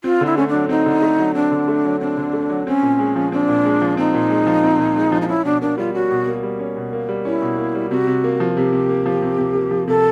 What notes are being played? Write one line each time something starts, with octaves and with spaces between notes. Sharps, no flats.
C4 F4
D3
E4
A3 C#4
D4
F#3
C4 D#4
D3
A3
F#3
C4 D4
D3
A3
F#3
C4 D4
D3
A3
F#3
C4 C#4
A#2
G#3
F3
C4 D4
A#2
G#3
F3
C4 D#4
A#2
G#3
F3
C4
A#2
G#3
F3
D#4
C#4 E4
B2 D4
A#3 D4
G3 F4
C#4 F#4
B2
A#3
G3
C#4
B2
A#3
G3
C#4 E4
B2
A#3
G3
C3 F#4
C3
A#3
F3
C3 G4
C3
A#3
F3
C3
C3
A#3
F3
C3 A4